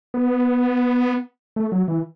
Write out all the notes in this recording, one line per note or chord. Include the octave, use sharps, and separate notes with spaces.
B3
A3
F#3
E3